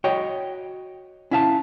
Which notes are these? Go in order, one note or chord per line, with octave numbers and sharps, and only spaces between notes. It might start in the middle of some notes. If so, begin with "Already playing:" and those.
F#4 C#5 D#5 G5
C#4 E4 E5 F5 A5